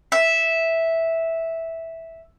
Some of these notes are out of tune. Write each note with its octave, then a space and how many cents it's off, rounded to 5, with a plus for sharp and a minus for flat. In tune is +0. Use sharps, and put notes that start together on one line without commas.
E5 -5